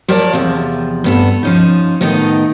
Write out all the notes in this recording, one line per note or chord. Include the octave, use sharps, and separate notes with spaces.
F3 A#4 C#5 D5 A5
E2 C3 F3
G2 B3 A4
F3 C#4 D#4
A2 D#3 B3 D#4 A4